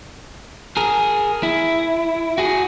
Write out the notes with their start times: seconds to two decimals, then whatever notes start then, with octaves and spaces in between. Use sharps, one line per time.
0.77 G#4 A#4
1.43 E4
2.38 F#4 G#4